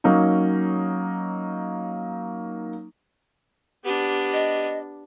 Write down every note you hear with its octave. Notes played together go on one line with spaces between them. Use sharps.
F#3 A#3 C#4 D#4
B3 D4 G4
D#5